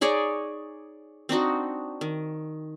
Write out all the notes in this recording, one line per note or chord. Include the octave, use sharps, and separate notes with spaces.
D#4 G#4 C#5 D5
C4 D4 D#4 F#4
D#3